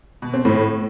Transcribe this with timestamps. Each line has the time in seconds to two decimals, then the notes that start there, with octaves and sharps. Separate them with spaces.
0.22 B2
0.34 C4
0.45 A2